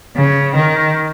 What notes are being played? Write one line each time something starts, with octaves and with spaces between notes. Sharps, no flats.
C#3
D#3